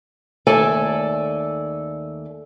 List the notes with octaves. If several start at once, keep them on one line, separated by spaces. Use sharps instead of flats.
D#2 A3 A4 D5 G#5